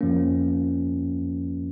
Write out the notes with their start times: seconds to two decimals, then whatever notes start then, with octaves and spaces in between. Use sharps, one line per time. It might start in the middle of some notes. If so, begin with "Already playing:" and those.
0.01 F2 F3 A#3 C#4